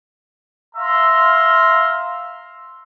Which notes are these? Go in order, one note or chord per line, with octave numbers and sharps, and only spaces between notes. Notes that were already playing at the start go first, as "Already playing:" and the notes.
E5 F5 A#5 C6